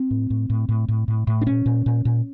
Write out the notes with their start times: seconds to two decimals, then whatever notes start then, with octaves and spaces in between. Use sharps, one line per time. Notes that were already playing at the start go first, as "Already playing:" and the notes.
Already playing: C4
0.11 A2
0.30 A2
0.50 A2
0.69 A2
0.88 A2
1.08 A2
1.27 A2
1.41 D4
1.46 A#2 C#4
1.66 A#2
1.86 A#2
2.05 A#2